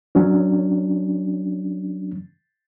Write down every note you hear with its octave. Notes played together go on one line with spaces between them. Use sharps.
F#3 C#4 D4